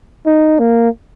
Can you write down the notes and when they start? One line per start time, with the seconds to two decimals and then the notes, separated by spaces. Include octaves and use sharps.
0.26 D#4
0.59 A#3